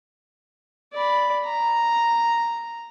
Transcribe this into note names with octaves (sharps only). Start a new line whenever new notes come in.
D5 B5
A#5